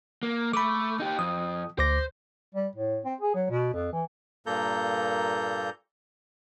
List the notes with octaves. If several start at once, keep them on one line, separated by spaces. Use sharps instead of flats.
A#3
A3 B5 D6
D#4 G4
F2 D#6
D2 C5 D6 A#6
G3
A2
C4
G#4
F#3
B2
F2
E3
G2 A#2 A#3 A4 A#5 G6